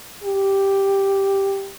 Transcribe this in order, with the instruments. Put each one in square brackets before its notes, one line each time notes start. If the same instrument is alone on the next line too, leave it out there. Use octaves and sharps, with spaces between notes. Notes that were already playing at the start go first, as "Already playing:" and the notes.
[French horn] G4